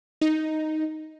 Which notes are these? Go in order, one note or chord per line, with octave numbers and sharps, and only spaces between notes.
D#4